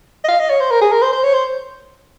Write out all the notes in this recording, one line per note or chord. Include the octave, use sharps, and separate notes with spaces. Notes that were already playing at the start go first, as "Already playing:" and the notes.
D#5
F5
D#5
C#5
C5
A#4
G#4
A#4
C5
C5
C#5
C5